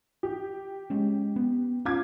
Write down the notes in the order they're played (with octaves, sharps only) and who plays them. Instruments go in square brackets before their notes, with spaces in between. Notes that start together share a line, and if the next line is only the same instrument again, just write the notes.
[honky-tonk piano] G4
[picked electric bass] G#3 C#4
B3
[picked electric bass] C#4 [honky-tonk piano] F4 D6 G#6